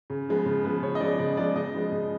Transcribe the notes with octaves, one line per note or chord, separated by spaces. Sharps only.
C#3
F3 G#3 B3
C#3
F3 G#3 B3
C#3 C#5
D#5
F3 G#3 B3 D5
C#3 D5
F3 G#3 B3 D5
C#3 D#5
F3 G#3 B3
C#3